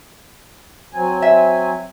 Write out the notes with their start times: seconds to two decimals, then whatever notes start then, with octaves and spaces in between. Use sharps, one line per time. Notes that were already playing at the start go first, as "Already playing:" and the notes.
0.94 F#3 C4 G#5
1.22 E5